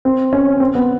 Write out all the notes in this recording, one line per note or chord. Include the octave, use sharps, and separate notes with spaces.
C4
C#4
C4
B3